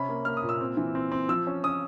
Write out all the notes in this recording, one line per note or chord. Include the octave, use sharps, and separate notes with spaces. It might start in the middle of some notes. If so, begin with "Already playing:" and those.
Already playing: C3 C#4 B5
A#3
A#3 F6
D#6
A#2
E6
C4
E3
C4
C4
F3 E6
C#4
C#4 D#6